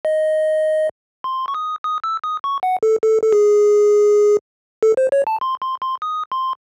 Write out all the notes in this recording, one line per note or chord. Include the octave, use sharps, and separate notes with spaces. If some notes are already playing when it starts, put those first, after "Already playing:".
D#5
C6
C#6
D#6
D#6
E6
D#6
C#6
F#5
A4
A4
A4
G#4
A4
C5
C#5
A5
C6
C6
C6
D#6
C6